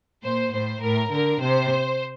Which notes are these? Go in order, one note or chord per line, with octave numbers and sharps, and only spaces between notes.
A#2 C5
A2 C5
A2 A#4
D3 A#4
C3 C5